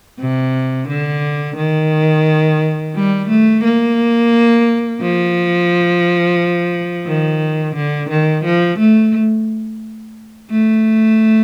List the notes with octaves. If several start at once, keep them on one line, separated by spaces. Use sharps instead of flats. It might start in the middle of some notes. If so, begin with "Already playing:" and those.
C3
D3
D#3
G3
A3
A#3
F3
D#3
D3
D#3
F3
A3
A3